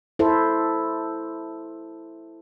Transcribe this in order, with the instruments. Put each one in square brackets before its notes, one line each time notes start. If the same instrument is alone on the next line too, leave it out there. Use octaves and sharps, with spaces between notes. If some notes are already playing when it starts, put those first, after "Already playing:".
[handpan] E4 A4 C5